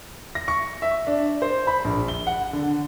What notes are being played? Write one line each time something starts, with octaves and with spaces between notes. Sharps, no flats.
A#6
C#6
E5
D4
C5
B5
A#1
G7
F#5
D3